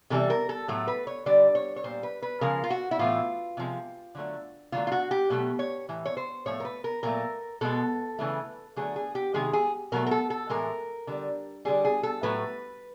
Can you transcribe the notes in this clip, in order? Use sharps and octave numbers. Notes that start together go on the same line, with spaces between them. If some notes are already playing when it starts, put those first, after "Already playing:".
C3 E3 G3 A4
A#4
A4
A2 F#3 A3
B4
C#5
D3 G3 D5
C#5
C#5
A#2 G3 C5
B4
B4
C#3 F3 G#3 A#4
F4
F#4
E4
A2 E3 A3 F4
C3 F3 G#3
D3 F#3 A3
D3 F#3 A3 F4
F4
F#4
G4
B2 F#3 A3
C#5
A2 E3
C#5
C5
A2 F3 A3 C#5
A#4
B4
A#4
A#2 F#3 A3 A#4
B2 G#3 A4
C#3 E3 A3
D3 F#3 A3 G#4
G#4
G4
C3 D#3 G#3 G#4
G#4
B2 F#3 A3 A#4
A#4
A4
A4
A2 E3 G#3 A#4
D3 G3
D3 G3 G#4
G#4
A4
A2 F#3 A3 B4